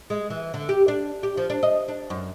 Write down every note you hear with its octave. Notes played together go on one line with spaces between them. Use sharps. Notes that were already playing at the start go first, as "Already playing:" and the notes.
G#3
E3
D3
G4
D4
G4
F3
D4
D#5
D4
F#2